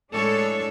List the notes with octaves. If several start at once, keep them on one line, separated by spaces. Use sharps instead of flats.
A2 G#3 D4 A4 C#5